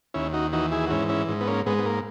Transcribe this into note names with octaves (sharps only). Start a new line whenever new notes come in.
D#2 C#4 E4
D#4 F#4
E3 D#4 F#4
E4 G#4
F#4
G#2 C#4 E4
C#4 E4
G#2
B3
A#3 C#4
G#2 G#3 B3
B3
A#3